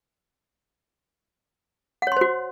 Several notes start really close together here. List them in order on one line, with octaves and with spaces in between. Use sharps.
F#5 C#5 C6 C5 F#4